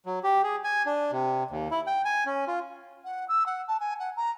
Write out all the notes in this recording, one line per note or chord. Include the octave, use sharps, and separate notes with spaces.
F#3
G4
G#4
G#5
D4
C3
D#2
E4
G5
G#5
C#4
F4
F#5
E6
F#5
A5
G#5
F#5
A#5